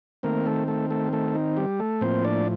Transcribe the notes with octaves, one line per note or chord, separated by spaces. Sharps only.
D#3 A3 A#3 C4 A#4
A3 A4
A3 A4
A3 A4
A3 A4
D#4
G3 G4
A3 A4
A2 F3 A#3 C4 C5
D4 D5